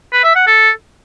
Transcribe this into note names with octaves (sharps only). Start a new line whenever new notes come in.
B4
E5
F#5
A4